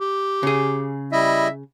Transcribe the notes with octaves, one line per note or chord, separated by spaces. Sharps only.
G4
C#3 G#4
G3 E4 D#5 E5